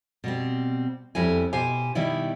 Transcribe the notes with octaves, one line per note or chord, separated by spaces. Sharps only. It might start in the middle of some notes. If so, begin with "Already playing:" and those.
B2 G3 C4
F2 G3 B3 E4 C#5 G#5
B2 G4 C5 G#5
B2 D#3 G3 D#4 E4 D5